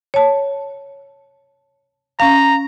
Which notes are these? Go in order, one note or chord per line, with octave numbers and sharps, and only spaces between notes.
C#5 A5
C#4 F5 A#5